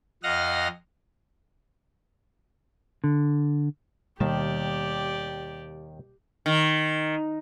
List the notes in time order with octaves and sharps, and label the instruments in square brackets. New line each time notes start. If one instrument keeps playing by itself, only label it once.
[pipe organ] F2 D#5 F5 F#5 F6 A#6
[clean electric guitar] D3
[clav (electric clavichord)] D#2 D#3 A5 [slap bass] B2 G3 A#3 [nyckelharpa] G4 D5
[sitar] D#3